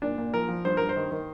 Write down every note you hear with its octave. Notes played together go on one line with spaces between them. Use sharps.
A#2 D4
A#2
F3 A#4
F3
G2 C5
G2 A#4
C5
D#3
D#3